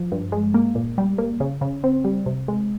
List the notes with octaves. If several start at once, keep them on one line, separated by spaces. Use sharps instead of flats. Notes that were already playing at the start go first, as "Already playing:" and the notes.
Already playing: F3
G2
G#3
A#3
A#2
G3
A#3
C#3
C#3
C4
G3
C3
G#3